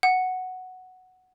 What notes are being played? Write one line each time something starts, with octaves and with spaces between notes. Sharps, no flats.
F#5